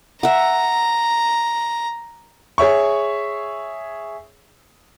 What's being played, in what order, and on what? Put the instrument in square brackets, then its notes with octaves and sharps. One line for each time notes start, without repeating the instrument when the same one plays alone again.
[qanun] E5 F#5 [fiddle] A#5
[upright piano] G#4 C#5 E5 C#6